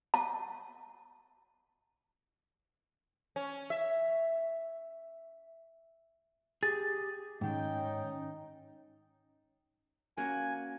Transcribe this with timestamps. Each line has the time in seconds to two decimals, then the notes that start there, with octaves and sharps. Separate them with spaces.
0.14 A5
3.36 C#4
3.70 E5
6.63 G4 G#4 A6
7.41 G#2 D#3 C#4 D#4 G5
10.17 A#3 C#4 F#4 G#5